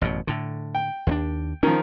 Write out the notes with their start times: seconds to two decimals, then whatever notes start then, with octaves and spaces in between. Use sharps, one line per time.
0.01 A1 F#2 B2
0.27 A2 D3
0.75 G5
1.07 D#2 B3 D4
1.63 D#3 F3 C#4